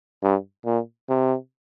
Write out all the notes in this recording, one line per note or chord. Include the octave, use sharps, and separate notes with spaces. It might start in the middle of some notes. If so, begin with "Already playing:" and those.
G2
A#2
C3